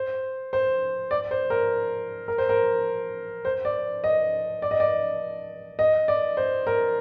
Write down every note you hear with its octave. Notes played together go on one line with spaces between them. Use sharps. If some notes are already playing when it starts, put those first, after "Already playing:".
Already playing: C5
C5
D5
C5
A#4
A#4
C5
A#4
C5
D5
D#5
D5
D#5
D5
D#5
D5
C5
A#4